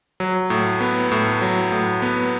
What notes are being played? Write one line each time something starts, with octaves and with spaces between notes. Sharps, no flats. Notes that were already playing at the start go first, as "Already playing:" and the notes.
F#3
A2
B3
A2
F#3
A2
B3